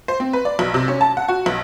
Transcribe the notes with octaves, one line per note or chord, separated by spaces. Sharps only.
C5
C4
B4
D5
B1
C3
C#4
A5
F#5
F#4
B1